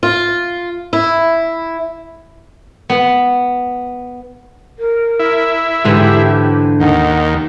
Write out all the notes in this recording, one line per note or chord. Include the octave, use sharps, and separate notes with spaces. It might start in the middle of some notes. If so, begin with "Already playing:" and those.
F4
E4
B3
A#4
E4
G#2 D3 E3 G4
D#2 F#5